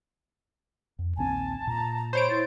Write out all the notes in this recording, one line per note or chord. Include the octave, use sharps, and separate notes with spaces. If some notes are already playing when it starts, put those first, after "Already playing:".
F2
A#1 D#2 C4 G#5 A5
A#2 A#5
C5 C#5 B5 D7
E4 A6